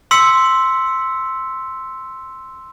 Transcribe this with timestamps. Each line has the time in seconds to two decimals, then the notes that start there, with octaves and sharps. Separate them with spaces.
0.11 C6 E6 B6 C#7